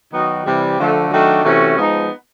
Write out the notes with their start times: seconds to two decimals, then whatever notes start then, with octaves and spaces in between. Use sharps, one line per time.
0.12 D#3 F#3 B3 D#4 F#4
0.45 C3 E3 G3
0.78 D3 F3 A3
1.10 D#3 F#3 A3 D4 F#4
1.43 C3 E3 A3 C#4 F#4
1.76 F3 G#3 B3 D#4